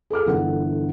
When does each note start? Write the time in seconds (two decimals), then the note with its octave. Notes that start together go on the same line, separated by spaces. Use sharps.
0.10 G#4 A4 D6 F6
0.26 G1 D3 E3 A#4 F#5